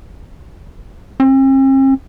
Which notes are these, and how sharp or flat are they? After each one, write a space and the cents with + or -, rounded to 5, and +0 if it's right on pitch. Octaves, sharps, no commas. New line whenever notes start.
C4 +45